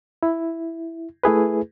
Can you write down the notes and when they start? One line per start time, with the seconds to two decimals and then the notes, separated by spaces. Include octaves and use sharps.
0.23 E4
1.24 A3 E4 G#4 B4